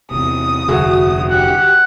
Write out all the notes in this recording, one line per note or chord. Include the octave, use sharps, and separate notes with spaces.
E2 C3 D#6
F1 D2 G2 D3 F#4 G#4
G4 F#5